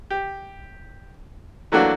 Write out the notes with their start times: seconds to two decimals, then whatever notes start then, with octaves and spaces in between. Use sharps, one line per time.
0.10 G4
1.72 E3 F#3 A3 A#3 D4 F#4